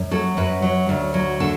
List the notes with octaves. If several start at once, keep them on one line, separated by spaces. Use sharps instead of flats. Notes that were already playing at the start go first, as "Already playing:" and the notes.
Already playing: F#2
F#3 A4
F#2 B4
F#3
D2
F#3
D3 A4